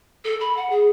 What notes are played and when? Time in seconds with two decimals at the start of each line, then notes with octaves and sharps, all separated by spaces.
0.24 A4
0.40 B5
0.57 F#5
0.70 G#4